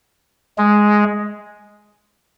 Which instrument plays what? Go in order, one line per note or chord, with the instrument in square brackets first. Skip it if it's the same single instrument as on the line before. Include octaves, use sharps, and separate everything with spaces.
[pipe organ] G#3